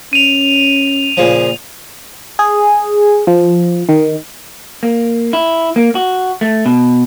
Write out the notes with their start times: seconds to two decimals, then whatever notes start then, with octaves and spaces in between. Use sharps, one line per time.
0.13 C#4 D#7 F7
1.17 A#2 C#3 F3
2.39 G#4
3.27 F3
3.89 D#3
4.83 A#3
5.33 E4
5.76 A#3
5.95 F#4
6.41 A3
6.66 B2